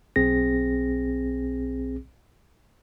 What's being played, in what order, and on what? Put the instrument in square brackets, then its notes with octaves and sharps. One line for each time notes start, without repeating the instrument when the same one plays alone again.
[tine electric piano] B1 C4 G#4 A#6